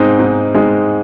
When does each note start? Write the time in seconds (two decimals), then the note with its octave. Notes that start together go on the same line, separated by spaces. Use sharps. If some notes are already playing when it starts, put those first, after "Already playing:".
Already playing: G#2 G#3 C4 D#4
0.19 G#2
0.54 G#3 C4 D#4